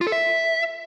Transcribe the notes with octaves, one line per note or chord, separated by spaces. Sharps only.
F4
A4
E5